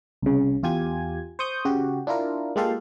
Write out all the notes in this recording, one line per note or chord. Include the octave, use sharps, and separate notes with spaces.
C2 C#3
E2 F4 G4 G#5 G#6
C5 C#6 D#6 G6
C#3 F#4 G4
D4 E4 F4 A#4
G#3 A#3 F4 G4 A4 F5